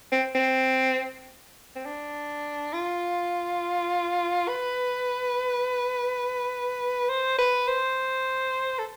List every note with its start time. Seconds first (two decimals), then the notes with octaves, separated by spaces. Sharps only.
0.12 C4
0.35 C4
1.76 C4
1.86 D4
2.74 F4
4.48 B4
7.09 C5
7.39 B4
7.68 C5
8.79 A4